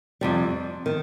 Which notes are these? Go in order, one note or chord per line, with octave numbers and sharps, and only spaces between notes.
F2 C3 G3
D#3